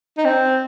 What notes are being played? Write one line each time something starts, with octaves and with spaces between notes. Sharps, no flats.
D#4
C4